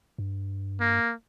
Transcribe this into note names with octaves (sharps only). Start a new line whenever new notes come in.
G2
A#3